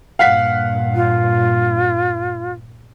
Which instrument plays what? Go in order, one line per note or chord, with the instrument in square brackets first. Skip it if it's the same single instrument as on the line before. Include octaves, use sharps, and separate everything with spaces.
[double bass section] G2 A#2 [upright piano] F5 F#5 B6
[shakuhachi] F4